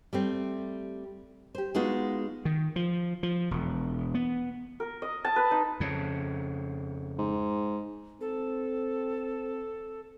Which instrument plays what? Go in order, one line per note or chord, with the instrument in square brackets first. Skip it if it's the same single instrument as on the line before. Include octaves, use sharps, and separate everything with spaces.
[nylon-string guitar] G3 A3 C4
G4 C5
G#3 B3 D#4 F4 F#4
[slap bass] D#3
F3
F3
E1
B3
[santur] A#4
D#5
A5
B4
D#4
[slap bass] F2 C#3
[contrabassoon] G#2
[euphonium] C4 [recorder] A4